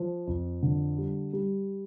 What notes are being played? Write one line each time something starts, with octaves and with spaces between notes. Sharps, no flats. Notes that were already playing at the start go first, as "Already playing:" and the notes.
Already playing: F3
F2
D3
G3
G3